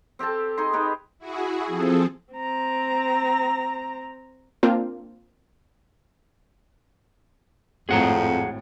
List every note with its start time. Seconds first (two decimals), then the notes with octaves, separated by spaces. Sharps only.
0.19 C4 G4 A4 A5
0.58 D#4 G#4 D#5 C6
0.73 D#4 G4 G#4 B4
1.19 E4 F#4 G#4
1.67 F3 C4 G#4 A4
2.33 C4 A#5
4.63 A#3 C4 D4 F4
7.89 G#1 F2 A2 G#4 F#5 A#5